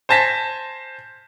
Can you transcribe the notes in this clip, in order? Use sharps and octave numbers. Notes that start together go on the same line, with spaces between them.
C5 G#5 A5 A#6 B6